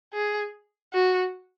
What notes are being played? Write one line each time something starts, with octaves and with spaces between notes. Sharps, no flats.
G#4
F#4